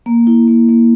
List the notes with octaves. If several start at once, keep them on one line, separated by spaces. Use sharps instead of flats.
A#3
E4
A#3
A#3